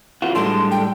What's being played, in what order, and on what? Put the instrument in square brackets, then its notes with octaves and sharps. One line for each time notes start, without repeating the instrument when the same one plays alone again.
[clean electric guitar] C#3 E3 F#4 [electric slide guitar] F4
[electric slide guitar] A2 G3 G#3 [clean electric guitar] D4 A4 [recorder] C6
[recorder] G5